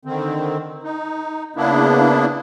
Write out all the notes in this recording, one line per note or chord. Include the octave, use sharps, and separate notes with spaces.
D3 D#3 C4
D#4
C#3 A#3 B3 D4 E4